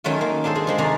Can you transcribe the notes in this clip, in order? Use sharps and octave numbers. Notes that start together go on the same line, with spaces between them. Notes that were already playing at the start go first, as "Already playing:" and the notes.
D#3 F#3 A3 C#4 F4
A#3
D4 F4 G#4 A4 C5
G#3 G#4
F3 G#3 A#3
C3 D#3 G#4 D5 A#5 C6